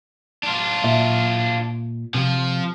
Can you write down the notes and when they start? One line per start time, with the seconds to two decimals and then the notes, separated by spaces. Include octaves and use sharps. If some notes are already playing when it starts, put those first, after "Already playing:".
0.43 D4 F4
0.84 A#2 E5
2.14 C3 F3